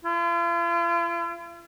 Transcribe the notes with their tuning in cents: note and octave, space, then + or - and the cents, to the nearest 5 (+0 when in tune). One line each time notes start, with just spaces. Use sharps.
F4 -45